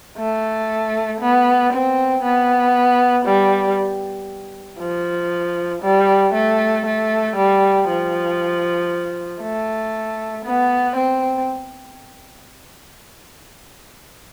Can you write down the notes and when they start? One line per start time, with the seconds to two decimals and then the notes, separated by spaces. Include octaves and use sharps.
0.18 A3
1.21 B3
1.73 C4
2.23 B3
3.25 G3
4.79 F3
5.82 G3
6.34 A3
6.86 A3
7.36 G3
7.88 F3
9.42 A3
10.45 B3
10.96 C4